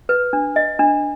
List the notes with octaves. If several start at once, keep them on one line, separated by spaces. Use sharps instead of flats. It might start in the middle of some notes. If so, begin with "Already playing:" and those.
B4
D4
D#5
D4